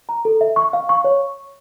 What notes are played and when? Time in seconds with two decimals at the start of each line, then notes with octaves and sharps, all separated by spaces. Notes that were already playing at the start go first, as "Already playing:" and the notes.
0.09 A#5
0.25 A4
0.41 E5
0.56 C#6
0.73 F5
0.89 C#6
1.04 C#5